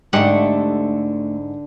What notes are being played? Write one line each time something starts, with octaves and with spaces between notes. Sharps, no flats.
G#2 D3 A3 D#4 G4 F#5